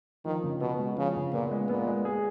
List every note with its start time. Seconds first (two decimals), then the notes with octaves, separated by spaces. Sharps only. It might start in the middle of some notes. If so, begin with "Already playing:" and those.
0.25 D#3 F3
0.44 C#3
0.61 B2 B3
0.79 G#3
0.97 C#3 F3
1.16 C#3
1.33 A#2 B3
1.51 G#3
1.69 A#2 B3
1.87 G#3
2.05 G#4